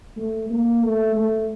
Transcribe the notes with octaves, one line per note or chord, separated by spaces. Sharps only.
A3
A#3
A3
A3